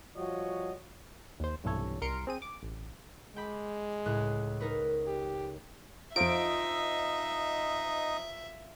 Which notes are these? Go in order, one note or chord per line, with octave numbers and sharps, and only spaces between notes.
F3 G3 F#4 C#5 D#5
D#2 C5
B1 G2 C3 E3 A4 C#5
C2 G3 A#4 C6 C#7 D7
C4 G#4 D#7
D6
A1
G#3 G5 B5 D6
C#2 A2 F#6
D#4 A#4 B4
G4
F2 D#4 F4 A4 C5 D#5 E5 D7